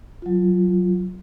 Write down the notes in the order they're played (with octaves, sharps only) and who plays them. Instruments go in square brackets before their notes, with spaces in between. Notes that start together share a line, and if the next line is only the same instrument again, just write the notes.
[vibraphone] F#3 F4